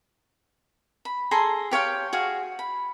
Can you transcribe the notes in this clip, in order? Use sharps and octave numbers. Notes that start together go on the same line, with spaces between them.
B5
G#4 A4 A#5 C6
G4 C#5 F5 G5
F#4 G#4 C#5 F5
B5